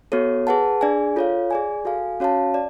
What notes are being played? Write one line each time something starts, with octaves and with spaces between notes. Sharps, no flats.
B3 F#4 A4 C#5
G#4 B4 F#5 A5
D4 G#4 D5 G#5
F4 A4 C#5 F5
G#4 D5 G#5
F#4 A4 F5 G#5
C#4 F#4 C#5 F5 A5
D5